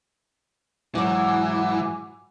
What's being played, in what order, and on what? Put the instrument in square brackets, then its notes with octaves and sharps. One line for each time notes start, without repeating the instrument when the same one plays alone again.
[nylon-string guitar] G#2 F#3 [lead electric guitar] E3 [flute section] F#5 G#5 D6